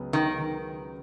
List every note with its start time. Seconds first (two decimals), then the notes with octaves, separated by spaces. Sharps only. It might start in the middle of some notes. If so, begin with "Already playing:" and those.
Already playing: C#2 C#3 F#3 B3
0.13 D#3